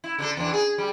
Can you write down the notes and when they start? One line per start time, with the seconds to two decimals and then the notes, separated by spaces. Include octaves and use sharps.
0.04 E4
0.18 D3 D4 A4
0.37 E2 E3 D4
0.53 G#4
0.78 G3